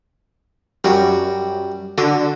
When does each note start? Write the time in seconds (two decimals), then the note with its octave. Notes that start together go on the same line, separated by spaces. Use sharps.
0.84 F#2 G3 F#4
1.98 D3 F#4